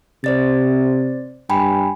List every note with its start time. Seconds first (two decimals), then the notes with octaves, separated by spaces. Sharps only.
0.24 C3 C5 D5 A6
1.50 G2 G5 G#5 B5